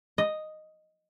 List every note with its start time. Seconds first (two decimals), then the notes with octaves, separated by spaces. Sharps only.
0.18 D#5